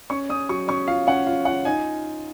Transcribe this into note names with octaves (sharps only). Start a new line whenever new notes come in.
C#4 C#6
C#4 D#6
F#3 C#6
C#4 C#6
F4 F5
C#4 F#5
F4 F5
F4 F#5
D#4 G#5